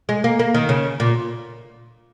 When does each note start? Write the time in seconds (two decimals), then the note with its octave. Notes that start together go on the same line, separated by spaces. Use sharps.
0.09 G#3
0.24 A#3
0.39 A#3
0.54 D#3
0.69 C#3
1.00 A#2